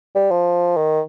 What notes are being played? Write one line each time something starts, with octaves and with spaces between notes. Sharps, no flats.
G3
F3
D#3